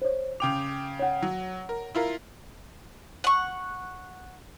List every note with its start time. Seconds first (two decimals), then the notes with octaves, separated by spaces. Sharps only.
0.02 C5 C#5
0.40 C#3 G5 D6 G6 F7
0.99 C#5 F#5
1.22 F#3
1.69 A#4
1.95 E4 F4 A#4
3.24 F#5 C#6